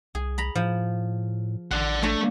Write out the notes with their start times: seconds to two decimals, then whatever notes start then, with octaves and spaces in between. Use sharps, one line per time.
0.15 C2 G#4
0.38 A#5 B5
0.55 A2 F3
1.71 A1 D5 F#5 C6
2.02 A3 D4 C#5 A#5